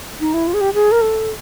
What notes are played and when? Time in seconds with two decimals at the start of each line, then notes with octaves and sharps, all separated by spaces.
0.20 D#4
0.34 E4
0.47 F4
0.54 G#4
0.61 G4
0.74 G#4
0.92 A#4
1.02 A4